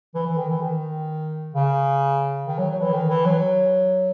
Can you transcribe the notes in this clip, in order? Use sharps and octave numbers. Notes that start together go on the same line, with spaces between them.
E3
E3
D#3
E3
D#3
C#3
D#3
F#3
F#3
E3
D#3
E3
F#3